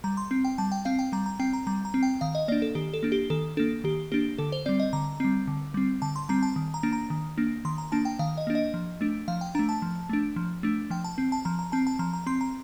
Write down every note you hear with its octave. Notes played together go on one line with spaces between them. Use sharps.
G3 A#5
C6
C4
G5
G3 A5
G5
C4 F5
G5
G3 A#5
A#5
C4 G5
A#5
G3 A#5
A#5
C4
G5
D#3 F5
D#5
A#3 D4 D5
A4
D#3 G4
A4
A#3 D4
G4
D#3 A4
A#3 D4 A4
D#3 G4
A#3 D4 G4
D3 A4
C5
G3 C4 D5
D#5
D3 A#5
G3 C4
D3
G3 C4
D3 A5
C6
G3 C4 A#5
A5
D#3
A#5
A#3 D4
A#5
D#3
A#3 D4
D#3 C6
A#5
A#3 D4 A5
G5
D#3 F5
D#5
A#3 D4
D#5
F3
A3 D4
F3 F5
G5
A3 D4 A#5
A5
F3
A3 D4
F3
A3 D4
F3 G5
A5
C4
A5
F3 A#5
A#5
C4 A5
A5
F3 A#5
A#5
C4 C6
A#5